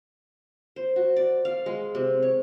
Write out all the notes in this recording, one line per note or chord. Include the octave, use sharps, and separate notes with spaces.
C5
F#4
D5
F5
G#3
C3
C#5